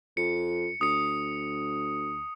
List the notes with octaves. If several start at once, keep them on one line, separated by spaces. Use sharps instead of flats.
F2 C#7
D2 D#6 C#7